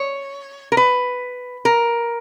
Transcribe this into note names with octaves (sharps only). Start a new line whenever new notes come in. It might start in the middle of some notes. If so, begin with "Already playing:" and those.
Already playing: C#5
A#4
B4
A#4